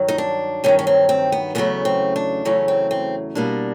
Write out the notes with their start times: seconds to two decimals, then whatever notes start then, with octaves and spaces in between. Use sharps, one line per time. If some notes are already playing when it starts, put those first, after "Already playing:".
Already playing: G2 D#3 F#3
0.08 D#4
0.18 D4
0.64 G2 D#3 F#3 C#4
0.79 C#4
0.87 C4
1.09 C4
1.32 B3
1.55 E2 C#3 F#3 A3 B3
1.85 C4
2.16 D4
2.45 E2 C#3 F#3 A3 C#4
2.68 C4
2.91 C4
3.35 B2 G3 A#3 D4